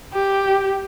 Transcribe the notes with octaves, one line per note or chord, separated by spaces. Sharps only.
G4